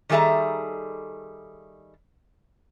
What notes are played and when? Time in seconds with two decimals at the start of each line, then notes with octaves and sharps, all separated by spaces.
0.09 D#3 G3 G#4 A4 E5 A#5